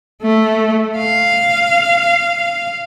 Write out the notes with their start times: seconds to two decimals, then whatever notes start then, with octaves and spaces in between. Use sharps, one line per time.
0.22 A3
0.98 F5